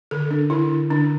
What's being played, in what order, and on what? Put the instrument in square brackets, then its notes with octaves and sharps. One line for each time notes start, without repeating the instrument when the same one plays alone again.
[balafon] D3 A4
D4
D3 E4
D4
D3 D4